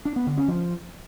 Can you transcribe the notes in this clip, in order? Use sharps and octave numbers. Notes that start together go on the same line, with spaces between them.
D4
B3
D3
C#4
F3